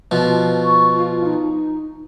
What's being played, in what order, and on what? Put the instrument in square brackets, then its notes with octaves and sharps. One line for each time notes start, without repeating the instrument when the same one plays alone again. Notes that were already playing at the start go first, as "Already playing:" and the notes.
[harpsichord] B2 F3
[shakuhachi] C#6
F4
D#4